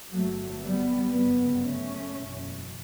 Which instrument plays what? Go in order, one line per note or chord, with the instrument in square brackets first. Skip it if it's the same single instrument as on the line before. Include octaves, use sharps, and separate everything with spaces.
[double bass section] G1 G2 F#3 A3
G3 B3
G1 F#2 C#3 G3 B3
A3 C#4
F#1 E2 B2